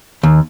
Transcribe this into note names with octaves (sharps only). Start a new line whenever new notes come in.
D#2